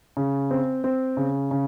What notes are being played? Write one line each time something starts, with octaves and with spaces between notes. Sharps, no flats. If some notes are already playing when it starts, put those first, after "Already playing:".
C#3
C4
C4
C#3
C#3